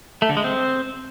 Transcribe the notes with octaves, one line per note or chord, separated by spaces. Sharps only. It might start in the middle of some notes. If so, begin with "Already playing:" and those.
A3
D3
G#3
C4